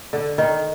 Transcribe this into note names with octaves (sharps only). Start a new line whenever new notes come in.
D3
D#3